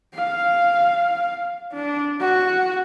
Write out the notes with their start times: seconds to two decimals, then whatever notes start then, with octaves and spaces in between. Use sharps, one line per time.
0.15 F5
1.73 D4
2.21 F#4